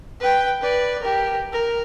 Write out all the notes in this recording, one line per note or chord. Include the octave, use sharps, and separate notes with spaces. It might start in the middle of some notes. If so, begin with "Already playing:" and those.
B4 G5
B4 D5
G4 A#4
A#4